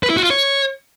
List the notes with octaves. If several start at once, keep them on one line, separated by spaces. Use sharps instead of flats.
B4
E4
F#4
F4
C#5